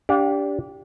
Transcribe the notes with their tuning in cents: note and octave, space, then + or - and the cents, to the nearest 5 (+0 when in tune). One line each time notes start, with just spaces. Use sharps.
D4 -25 G4 +0 F5 +35